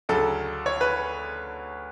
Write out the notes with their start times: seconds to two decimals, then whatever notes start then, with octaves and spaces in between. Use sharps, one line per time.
0.09 D2 C#3 F#3 A4
0.66 C#5
0.81 B4